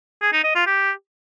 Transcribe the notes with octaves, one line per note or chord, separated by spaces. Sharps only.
G#4
D#4
D#5
F4
G4